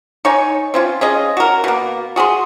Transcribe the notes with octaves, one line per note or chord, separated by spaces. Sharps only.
D#4 C#5 G#5
C4 C#4 F4
C#4 G#4 D#5
F#4 A#4
B2 A#3
F#4 G#4 B5 C6